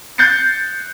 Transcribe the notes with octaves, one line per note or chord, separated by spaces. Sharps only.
F#6 G6 A6 C7 C#7